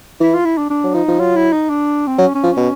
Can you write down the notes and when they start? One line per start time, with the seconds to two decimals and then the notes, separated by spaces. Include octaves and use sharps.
0.21 E3 E4
0.34 F4
0.45 E4
0.57 D4
0.70 D4
0.84 F#3
0.95 F3 D#4
1.08 F3
1.20 F#3 F4
1.36 E4
1.52 D#4
1.70 D4
2.07 C4
2.18 F#3 C#4
2.35 C#4
2.44 F3
2.51 C#4
2.57 B2